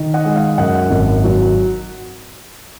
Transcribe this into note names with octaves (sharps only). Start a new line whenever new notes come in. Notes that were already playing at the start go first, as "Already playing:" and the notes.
Already playing: D#3
D#5 F#5
G#3
F5
F#2 D#5 F#5
G#1
F#3